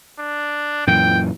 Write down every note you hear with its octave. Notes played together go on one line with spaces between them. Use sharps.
D4
F#2 A#2 E3 G5